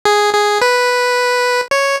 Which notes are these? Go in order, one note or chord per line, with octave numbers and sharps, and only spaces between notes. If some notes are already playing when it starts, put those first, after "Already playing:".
G#4
G#4
B4
C#5